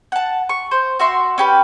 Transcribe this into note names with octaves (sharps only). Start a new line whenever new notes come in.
F#5 A5
C#6
C5
F#4 E5 C6
C#4 G4 B4